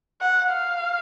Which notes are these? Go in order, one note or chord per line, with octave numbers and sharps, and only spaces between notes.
F#5
F5